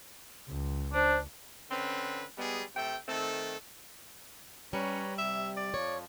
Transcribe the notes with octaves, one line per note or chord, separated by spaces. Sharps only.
C#2
D4 C5
D3 C4 C#4 B4
G3 G#3 B3 G#4
C3 A3 G5
D#3 A3 C4 A4
G3 C#4 B4 C#5 A#5
C3 E5
D5
F2 F3 C#5